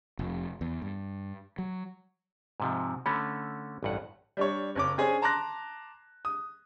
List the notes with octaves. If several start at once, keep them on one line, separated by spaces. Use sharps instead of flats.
F1
E2
G2
F#3
G#2 C3 F3
D3 A3 C#4 B5
A1 G2 F#5
G3 D4 C#5
F#1 C#4 D6
C#4 D4 G#4 C5 G#5
A5 A#5 C6 D6 F#6 A#6
D#6